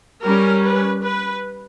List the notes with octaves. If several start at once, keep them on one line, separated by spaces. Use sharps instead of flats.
G3 C#4 A#4
B4
B4